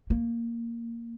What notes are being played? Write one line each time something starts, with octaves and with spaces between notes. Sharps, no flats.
A#3